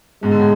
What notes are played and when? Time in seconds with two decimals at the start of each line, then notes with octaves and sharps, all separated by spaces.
0.23 G#2 B2 G#3
0.31 D3
0.39 A2